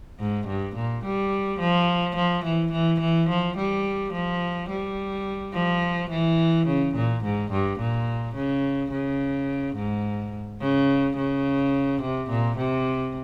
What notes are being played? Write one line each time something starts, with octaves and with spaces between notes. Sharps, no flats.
G#2
G2
A#2
G3
F3
F3
E3
E3
E3
F3
G3
F3
G3
F3
E3
C#3
A#2
G#2
G2
A#2
C#3
C#3
G#2
C#3
C#3
C3
A#2
C3